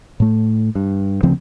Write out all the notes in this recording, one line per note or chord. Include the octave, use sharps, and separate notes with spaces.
A2 A3
G2
D2 C#3 F3 C4